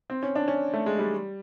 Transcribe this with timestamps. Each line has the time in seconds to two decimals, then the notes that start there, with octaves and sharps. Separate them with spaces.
0.10 C4
0.23 C#4
0.35 D4
0.48 C#4
0.73 A3
0.86 G#3
0.99 G3